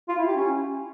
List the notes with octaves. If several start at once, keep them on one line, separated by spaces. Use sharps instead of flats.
F4
E4
G4
C#4